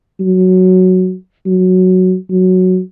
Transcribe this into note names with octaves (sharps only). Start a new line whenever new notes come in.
F#3
F#3
F#3